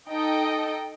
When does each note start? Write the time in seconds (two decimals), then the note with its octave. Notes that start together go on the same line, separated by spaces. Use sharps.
0.11 D#4 A4 D#5 G5